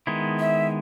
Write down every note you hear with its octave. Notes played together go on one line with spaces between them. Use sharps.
D#3 G#3 B3 E4
E5